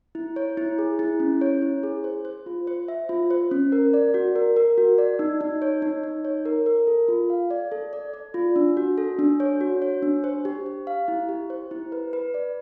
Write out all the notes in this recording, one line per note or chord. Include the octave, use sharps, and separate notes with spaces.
E4
C#5
E4
G#4
E4
C#4
C#5
E4
G#4
C5
C5
F4
C5
E5
F4
C5
C#4
A#4
D5
F#4
A#4
A#4
F#4
D5
D#4
D#4
C#5
D#4
D#4
C#5
A#4
A#4
A4
F4
F5
D5
A4
D5
D5
F4
D4
F#4
A4
D4
C#5
F#4
C#5
D4
C5
G4
G4
F5
E4
G4
C5
E4
B4
B4
D5